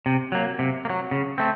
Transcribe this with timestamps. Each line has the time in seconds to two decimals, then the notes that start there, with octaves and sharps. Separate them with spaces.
0.06 C3
0.32 F#3 A#3
0.59 C3
0.85 A#3
0.90 F#3
1.11 C#3
1.38 A3 C4